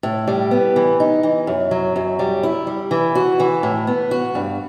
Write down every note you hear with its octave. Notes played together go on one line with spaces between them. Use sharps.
A2
G3
B3
E3
D#4
E3
F#2
F#3
F#2
G3
E4
G3
E3
F#4
E3
A2
B3
F#4
G2